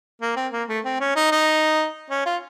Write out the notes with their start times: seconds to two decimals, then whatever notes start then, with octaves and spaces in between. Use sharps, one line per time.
0.22 A#3
0.36 C4
0.53 A#3
0.68 A3
0.85 C4
1.00 C#4
1.16 D#4
1.31 D#4
2.10 C#4
2.26 F4